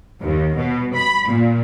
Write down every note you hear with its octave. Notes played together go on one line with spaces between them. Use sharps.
D#2
B2
B5
A#2